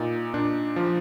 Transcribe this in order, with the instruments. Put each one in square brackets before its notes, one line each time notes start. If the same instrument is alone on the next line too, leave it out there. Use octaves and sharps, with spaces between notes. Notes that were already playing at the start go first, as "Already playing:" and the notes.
Already playing: [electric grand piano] A#2 D#4
A#2 D4
F3